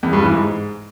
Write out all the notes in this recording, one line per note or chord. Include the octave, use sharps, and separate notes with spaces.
E2
G2
E3
G#2